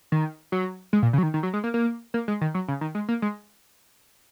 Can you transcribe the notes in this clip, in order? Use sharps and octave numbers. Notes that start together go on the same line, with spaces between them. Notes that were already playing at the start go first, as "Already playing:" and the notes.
D#3
F#3
G#3
A#2
C#3
F#3
D#3
D#3
F#3
G#3
A#3
A#3
A#3
G#3
D#3
F#3
C#3
D#3
G#3
A#3
G#3